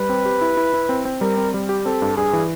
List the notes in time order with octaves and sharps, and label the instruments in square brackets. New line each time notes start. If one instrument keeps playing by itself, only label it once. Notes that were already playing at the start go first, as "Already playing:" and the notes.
Already playing: [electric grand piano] G3 [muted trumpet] B4
[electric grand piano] C4
G4
E4
E4
E4
C4
C4
[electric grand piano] G3 [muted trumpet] A#4
[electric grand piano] C4
G3
G4
[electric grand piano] C4 [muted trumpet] A4
[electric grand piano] G2
[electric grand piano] G2 [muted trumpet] G#4
[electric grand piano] E3